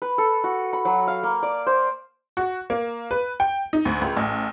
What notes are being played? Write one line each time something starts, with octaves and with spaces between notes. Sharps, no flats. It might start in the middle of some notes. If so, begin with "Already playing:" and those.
B4
A4
F#4
B5
F#3
F5
A#3
D5
C5
F#4
A#3
B4
G5
D#4
D2
C#2
A1